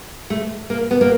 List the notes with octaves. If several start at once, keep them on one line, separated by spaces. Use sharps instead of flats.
A3
A#3
B3
A#3